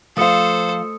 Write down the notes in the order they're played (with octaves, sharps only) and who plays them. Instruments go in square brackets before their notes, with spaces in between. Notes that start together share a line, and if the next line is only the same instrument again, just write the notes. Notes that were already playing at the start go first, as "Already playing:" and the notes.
[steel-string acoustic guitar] F3 F5 [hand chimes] A3 D#6 C#7 [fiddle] A4 C5